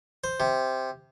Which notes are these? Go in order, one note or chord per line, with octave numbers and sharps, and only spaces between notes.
C5
C3